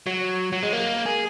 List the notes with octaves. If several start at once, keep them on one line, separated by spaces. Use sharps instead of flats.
F#3
F#3
G#3
A#3
G#4